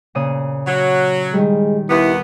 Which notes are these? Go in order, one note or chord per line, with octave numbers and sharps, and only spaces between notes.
A#2 C#3 D#6
F#3
D#3 G3 G#3
D#2 B3 E4